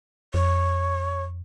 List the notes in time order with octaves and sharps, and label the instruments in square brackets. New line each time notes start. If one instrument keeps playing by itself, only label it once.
[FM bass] F2 [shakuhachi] C#5